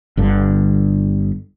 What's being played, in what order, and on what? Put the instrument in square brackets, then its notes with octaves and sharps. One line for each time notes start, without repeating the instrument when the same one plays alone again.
[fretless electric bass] G1 G2 D3